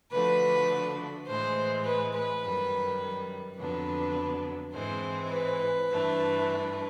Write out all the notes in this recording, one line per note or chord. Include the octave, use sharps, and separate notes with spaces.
D3 F3 A3 D4 F#4 B4
A2 E3 G#3 C5
B4
B4
F#2 D#3 G3
F2 D3 F#3 B3 D4 B4
G#2 E3 G#3 C4 C5
B4
G2 E3 A3 D4